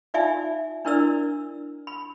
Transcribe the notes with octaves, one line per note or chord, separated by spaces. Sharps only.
D#4 F4 D5 E5 F5 G#5
D4 E4 A#4 B4 D5 E6
B5